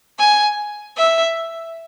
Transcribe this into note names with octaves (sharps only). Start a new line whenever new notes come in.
G#5
E5